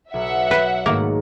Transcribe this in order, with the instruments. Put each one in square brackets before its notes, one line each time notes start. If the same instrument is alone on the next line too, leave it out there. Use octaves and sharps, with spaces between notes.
[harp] B1 [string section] E5 F#5
[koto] B4
[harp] G#2 D#3 A3 [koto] A#3